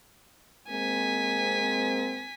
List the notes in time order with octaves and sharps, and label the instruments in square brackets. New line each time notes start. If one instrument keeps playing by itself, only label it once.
[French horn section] G#3 A#3 C4 [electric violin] G#5 B6